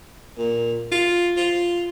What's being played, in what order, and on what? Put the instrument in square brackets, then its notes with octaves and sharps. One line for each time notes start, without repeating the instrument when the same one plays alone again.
[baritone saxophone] A#2
F4
F4